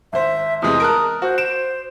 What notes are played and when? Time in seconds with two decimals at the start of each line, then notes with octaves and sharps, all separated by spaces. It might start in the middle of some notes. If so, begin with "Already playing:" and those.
0.13 G#1 C5 E5
0.62 E2 C3 G#3 D#6
0.80 A#4 A5 F#6
1.22 F#4 C5
1.38 D7 E7